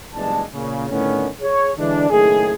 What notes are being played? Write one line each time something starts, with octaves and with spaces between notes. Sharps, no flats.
F#1 E2 G2 G#3 D4 A5
A#2 C#3
A2 D3 D#3 B3 C#4
G#4 C#5
D3 E3 G#3 D4
F#1 A2 D#3 G#4